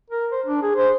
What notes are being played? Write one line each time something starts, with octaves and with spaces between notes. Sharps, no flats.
A#4
C5
D4
G#4
C5